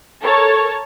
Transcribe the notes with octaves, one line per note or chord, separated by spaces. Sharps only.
A4 A#4 C#5 A5